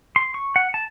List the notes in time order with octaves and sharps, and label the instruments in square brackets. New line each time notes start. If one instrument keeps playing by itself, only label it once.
[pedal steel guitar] C6
C#6
F#5
A5